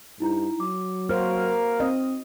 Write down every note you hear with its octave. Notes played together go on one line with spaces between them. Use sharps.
G2 D#4 E4 A#5
F#3 D6
A#3 F#4 A#4 C5 F6
C4 D#5